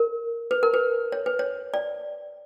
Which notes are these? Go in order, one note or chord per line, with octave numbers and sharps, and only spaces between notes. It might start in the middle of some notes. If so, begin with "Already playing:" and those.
Already playing: A#4
B4
A#4
B4
C#5
B4
C#5
D5